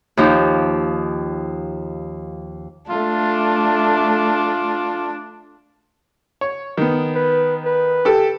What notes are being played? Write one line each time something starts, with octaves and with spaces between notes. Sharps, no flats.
D#2 F3 D#4
A3 D4 F4
C#5
D#3 B3
B4
B4
G4 A4 E6